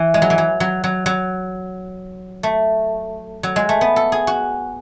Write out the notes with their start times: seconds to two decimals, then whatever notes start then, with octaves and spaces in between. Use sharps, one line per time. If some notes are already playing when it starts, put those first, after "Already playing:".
Already playing: E3
0.14 G#3
0.22 F#3
0.30 E3
0.38 F#3
0.60 F#3
0.84 F#3
1.06 F#3
2.43 A3
3.43 F#3
3.56 G#3
3.69 A3
3.81 B3
3.96 A4
4.12 G#4
4.27 F#4